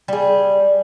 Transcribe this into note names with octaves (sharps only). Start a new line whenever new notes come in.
G3 G#4